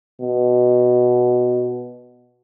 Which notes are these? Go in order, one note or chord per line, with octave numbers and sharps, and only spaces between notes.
B2